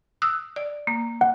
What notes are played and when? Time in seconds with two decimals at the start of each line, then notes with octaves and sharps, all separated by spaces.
0.22 D#6 E6 F#6
0.56 D5
0.87 A#3
1.21 F#5